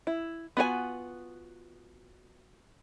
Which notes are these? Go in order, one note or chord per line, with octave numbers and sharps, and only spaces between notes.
E4
B3 F4 F#4 A#4 G#5